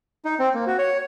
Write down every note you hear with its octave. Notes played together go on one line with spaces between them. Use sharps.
D#4
C4
A#3
F#4
C#5